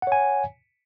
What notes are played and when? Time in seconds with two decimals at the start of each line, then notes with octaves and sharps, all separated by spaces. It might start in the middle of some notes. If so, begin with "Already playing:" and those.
0.02 F#5
0.07 C#5
0.12 G#5